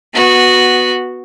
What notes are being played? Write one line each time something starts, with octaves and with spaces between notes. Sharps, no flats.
B3 F#4